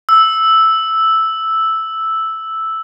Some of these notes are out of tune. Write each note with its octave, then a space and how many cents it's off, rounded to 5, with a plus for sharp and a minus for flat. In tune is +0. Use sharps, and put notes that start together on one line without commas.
E6 -5